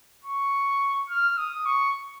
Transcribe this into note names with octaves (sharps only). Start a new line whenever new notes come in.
C#6
F6
D#6
C#6